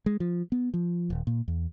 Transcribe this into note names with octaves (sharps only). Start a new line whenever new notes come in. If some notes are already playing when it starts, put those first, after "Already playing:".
G#3
F3
B3
F3
D#1
A#2
E2